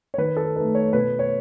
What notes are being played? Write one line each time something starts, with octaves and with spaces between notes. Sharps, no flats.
C#5
D#3 B4
A4
A3 D#4 B4
C#5
B2 B4
C#5